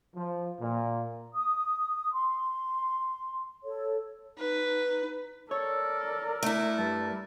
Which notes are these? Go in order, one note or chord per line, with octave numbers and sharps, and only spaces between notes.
F3
A#2
D#6
C6
A4 C#5
D#4 B4
A4 A#4 C#5 D5
A3 E4
G2 A5